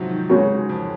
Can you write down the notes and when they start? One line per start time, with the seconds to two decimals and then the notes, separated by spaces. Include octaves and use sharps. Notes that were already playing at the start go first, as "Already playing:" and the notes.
Already playing: G#2 C3 F3 F#3
0.10 D#3
0.30 C#3 G#3 C#4 F#4 A#4
0.50 G#2
0.69 F2